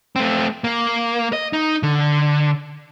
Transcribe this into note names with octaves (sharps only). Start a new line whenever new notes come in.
A3 C4
A#3
D#5
D#4
D3